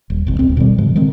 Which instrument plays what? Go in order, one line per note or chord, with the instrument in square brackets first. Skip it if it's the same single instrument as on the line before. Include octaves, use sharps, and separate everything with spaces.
[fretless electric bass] D#1
G1 C2
D#1 C2 C4
B2 D#3 G3
G#2 C#3 F3 G#3
D3 D#3 G#3 C4